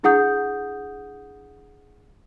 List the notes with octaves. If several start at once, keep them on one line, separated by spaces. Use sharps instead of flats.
D4 E4 G#4 F#5 D#6 G6